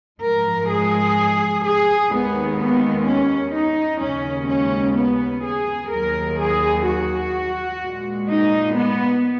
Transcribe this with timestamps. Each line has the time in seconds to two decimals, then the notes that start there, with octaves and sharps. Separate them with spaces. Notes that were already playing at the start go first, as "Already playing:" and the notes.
0.21 G#2 F3 G#3 A#4
0.68 G#4
1.64 G#4
2.11 D#2 D#3 G#3 B3
2.58 B3
3.06 C#4
3.54 D#4
4.01 D#2 C#3 G#3 C#4
4.48 C#4
4.96 B3
5.44 G#4
5.91 D#2 D#3 F#3 A#4
6.39 G#4
6.86 F#4
7.82 A#2 G#3
8.29 D#4
8.77 B3